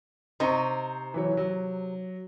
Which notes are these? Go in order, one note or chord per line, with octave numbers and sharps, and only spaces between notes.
C3 D#4 C5 C#6
E3 F#3 C#5
F#3